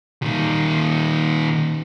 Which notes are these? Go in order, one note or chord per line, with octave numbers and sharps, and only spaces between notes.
A#2 D#3